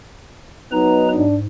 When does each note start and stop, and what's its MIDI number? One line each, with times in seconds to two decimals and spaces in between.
0.72 1.26 54
0.72 1.26 59
0.72 1.26 63
0.72 1.09 71
0.72 1.09 82
1.15 1.46 44
1.15 1.37 62